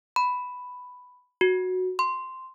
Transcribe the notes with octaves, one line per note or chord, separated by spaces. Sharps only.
B5
F#4
C6